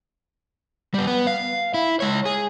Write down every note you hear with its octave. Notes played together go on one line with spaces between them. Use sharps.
G3 B3
B3
F5
E4
G#3 C#5
G#4